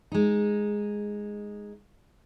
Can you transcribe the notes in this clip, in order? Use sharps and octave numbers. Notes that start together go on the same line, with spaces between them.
G#3 D#4